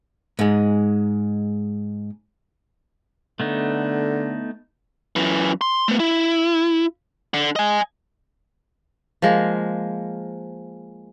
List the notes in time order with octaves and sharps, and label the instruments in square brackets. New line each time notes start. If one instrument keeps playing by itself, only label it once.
[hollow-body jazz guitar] G#2 G#3
[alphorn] D3 [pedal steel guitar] A3 B3 D#4
[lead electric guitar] F#2 E3
C6
A3 B3
E4
D3
D#5 G#5
[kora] F3 G#3 A#3